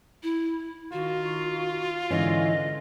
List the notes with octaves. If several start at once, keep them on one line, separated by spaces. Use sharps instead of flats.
E4
D#3 F4 F#4
G#2 D3 E3 C#4 D#5